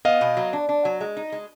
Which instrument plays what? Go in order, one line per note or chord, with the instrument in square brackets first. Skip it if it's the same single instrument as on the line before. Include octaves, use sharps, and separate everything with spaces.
[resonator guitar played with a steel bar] B3 [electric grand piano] D#5 F5
[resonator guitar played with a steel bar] B2
F#3
D4
D4
F#3
G#3
D#4
G#3